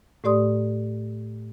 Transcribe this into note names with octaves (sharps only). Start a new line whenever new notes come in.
A2 A3 G4 D5 C6 D#6